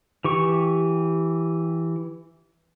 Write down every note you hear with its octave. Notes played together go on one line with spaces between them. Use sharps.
E3 G4 C#6